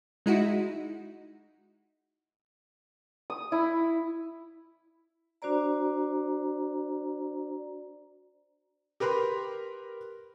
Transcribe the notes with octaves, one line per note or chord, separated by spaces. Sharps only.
G#3 D#4 E4 F#4
D#6
E4
D4 F#4 C5 D5 A#5
G4 A#4 B4 B5 C6